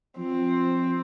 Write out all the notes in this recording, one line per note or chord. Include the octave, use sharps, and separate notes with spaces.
F3 C4